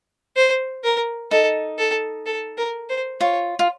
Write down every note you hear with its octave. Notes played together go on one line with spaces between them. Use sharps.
C5
A#4
D#4 A4
A4
A4
A#4
C5
F4 C#5
F4